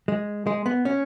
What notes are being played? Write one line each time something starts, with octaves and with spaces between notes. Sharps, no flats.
G#3
G#3
B3
C#4